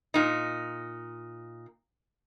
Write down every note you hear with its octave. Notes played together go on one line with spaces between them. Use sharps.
A#2 D#4